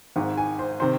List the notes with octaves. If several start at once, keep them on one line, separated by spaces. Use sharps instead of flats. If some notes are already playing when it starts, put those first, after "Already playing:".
G#1 G#2 D#3
G#5
C5
C3 D#3 C5